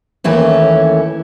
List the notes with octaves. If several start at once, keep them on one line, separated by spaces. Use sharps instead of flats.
D#2 E3 A3 C#4